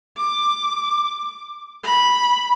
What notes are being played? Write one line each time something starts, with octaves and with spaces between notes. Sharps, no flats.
D6
B5